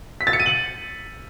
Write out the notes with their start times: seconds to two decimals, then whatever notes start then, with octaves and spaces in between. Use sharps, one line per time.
0.21 B6
0.27 A6
0.33 C#7
0.40 D#7
0.46 F#7